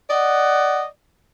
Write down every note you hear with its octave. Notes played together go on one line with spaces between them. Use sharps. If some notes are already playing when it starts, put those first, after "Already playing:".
D5 D#5 F#5